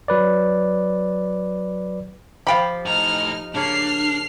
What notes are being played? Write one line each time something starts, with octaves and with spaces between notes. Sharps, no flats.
F#3 B4 D5
F3 F4 G4 F5 G5 B5
A2 D#4 A#5 F6
C#3 A#3 C#4 D4 F6 C7